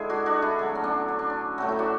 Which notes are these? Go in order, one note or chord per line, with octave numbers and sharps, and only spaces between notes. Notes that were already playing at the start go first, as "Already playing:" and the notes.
Already playing: D3 G#3 E4 G#4
D4 F#4
D4 F#4
E4 G#4
D3 F#3 A3
C#4
B3 D4
C#4
D4
C#4
A2 F#3 A3 F#4
E4
D4 F#4